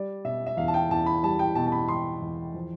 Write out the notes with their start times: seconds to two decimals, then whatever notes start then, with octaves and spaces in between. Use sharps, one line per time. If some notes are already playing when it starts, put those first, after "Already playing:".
Already playing: G3 D5
0.24 B2 E5
0.47 E5
0.57 E2 F5
0.68 A5
0.74 G5
0.91 E2 A5
1.06 B5
1.23 G3 A5
1.39 G5
1.55 B2 A5
1.67 A5
1.72 B5
1.88 E2 C6
2.22 E2
2.54 F3